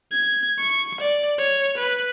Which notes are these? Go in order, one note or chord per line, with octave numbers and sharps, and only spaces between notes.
G#6
C#6
D5
C#5
B4